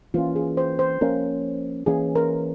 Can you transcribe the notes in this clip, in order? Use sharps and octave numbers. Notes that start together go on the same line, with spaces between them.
E3 A#3 C#4 F4
G#4
C5
C5
F3 A#3 C#4 A#4
E3 A#3 C#4 G#4
A#4